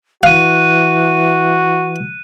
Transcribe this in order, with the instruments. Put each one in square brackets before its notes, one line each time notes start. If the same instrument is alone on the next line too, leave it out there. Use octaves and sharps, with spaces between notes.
[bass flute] E3 [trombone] F#4 [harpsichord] F5 [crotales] F#6 D#7